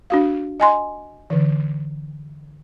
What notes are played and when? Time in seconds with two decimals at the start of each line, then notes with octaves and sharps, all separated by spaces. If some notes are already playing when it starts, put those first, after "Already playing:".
0.10 D4 F#4 F5
0.60 D#5 G#5 C6
1.30 D3 E3